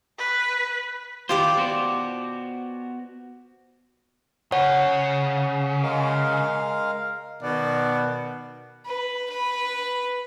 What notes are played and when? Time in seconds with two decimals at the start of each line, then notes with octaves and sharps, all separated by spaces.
0.18 B4
1.29 D#3 E4 F4 G4 C5 D5
1.57 B3 F#4 C5
4.52 C#3 C#5 F#5
5.83 G#3 A#4 F5
7.43 B2 D#3 D5
8.86 B4
9.30 B4